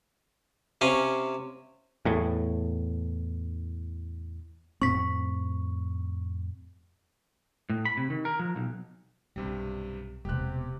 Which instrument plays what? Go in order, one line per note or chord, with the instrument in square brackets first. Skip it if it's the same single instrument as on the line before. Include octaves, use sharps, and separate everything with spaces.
[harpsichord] C3 C#4 F5 G#5
[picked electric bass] E2 A2
[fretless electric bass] F2 A2 C4 [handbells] C#6 B6
[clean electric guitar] A2
B5
C3
D#3
A#4
F3
B1
[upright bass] B1 [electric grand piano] G2 C3 G3
[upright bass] E1 B3 [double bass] C3 [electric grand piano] G4 F#6